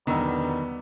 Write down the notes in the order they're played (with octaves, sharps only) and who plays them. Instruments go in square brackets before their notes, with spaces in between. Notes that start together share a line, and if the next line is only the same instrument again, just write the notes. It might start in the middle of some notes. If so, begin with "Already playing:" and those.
[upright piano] B1 E2 D3 [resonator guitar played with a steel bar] D#3 [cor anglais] G3 [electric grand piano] B3 E6